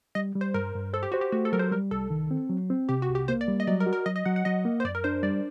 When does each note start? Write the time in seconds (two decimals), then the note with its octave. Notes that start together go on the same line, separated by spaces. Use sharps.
0.15 G3 D#5
0.35 G3
0.41 C5
0.54 G2 A#4
0.75 G2
0.93 A4 C5
1.03 G4
1.12 F#4 C5
1.21 G4
1.32 A3 F#4
1.45 A4
1.53 F#3 A#4
1.59 C5
1.71 G3 A#4
1.91 C2 A4
2.10 D#3
2.31 C4
2.49 F#3
2.70 C4
2.89 C3 G4
3.02 F#4
3.09 C2
3.15 G4
3.28 A#3 C5
3.41 D5
3.48 G3
3.60 D#5
3.67 F#3 D5
3.80 A#4
3.86 F#4
3.93 A#4
4.06 F#3 D#5
4.16 D#5
4.25 F#3 F#5
4.36 F#5
4.45 F#3 D#5
4.65 A#3
4.80 C5
4.85 F#2 D5
4.95 A#4
5.04 D4 C5
5.23 G3 D5